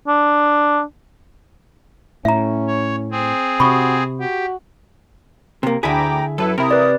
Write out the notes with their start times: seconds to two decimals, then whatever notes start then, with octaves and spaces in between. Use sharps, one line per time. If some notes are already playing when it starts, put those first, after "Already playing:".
0.07 D4
2.25 A2 C#4 E5 A#5
2.67 C#5
3.11 C4 G#4
3.60 C3 F#4 B5 C#6 D#6
4.20 F#4 G4
5.63 C3 A#3
5.83 D2 D3 E4 G#4 G5 A#5 B5 D6
6.38 F#2 E4 A4 B4 A5
6.58 C3 E4 A#4 D#6
6.71 B4 D5